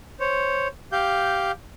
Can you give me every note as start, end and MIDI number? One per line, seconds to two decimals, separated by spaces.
0.20 0.68 72
0.20 0.68 73
0.92 1.52 67
0.92 1.52 77
0.92 1.52 91